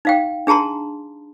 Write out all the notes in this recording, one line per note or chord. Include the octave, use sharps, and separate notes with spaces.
D#4 F5 G5
D4 G#4 A5 A#5 C6